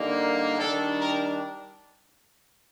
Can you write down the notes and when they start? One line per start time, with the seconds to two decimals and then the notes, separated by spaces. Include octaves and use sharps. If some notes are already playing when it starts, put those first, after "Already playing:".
Already playing: D3 G3 A#3 D#4
0.19 A#4
0.59 D#3 G3 D4 A4
1.00 A#4